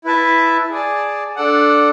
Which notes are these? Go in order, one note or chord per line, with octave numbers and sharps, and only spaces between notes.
E4 B4 E5 A5
G#4 D5 A5
D4 A4 D5 F#5